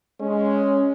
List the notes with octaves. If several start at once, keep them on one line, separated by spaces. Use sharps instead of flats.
G#3 C#4